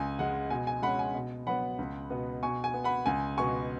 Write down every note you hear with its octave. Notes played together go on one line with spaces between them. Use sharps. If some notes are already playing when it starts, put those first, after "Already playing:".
Already playing: C#2 G#5
C#3 G#3 F#5
B2 G#5
G#5
G#3 C#4 F#5 B5
G#5
B2
F#3 B3 F#5 B5
C#2
B2 B3
B2 G#5 C#6
G#5
B3
F#5 B5
C#2 G#5
B2 B3 G#5 C#6